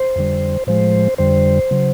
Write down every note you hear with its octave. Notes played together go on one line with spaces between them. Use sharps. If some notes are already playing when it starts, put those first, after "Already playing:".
Already playing: C5
F2 D3 G3
A2 F3 G#3 C5
F2 D3 G3 C5
C#3 F#3